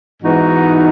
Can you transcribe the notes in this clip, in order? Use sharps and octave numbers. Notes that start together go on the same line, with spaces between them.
G#2 E3 B3 D#4 F#4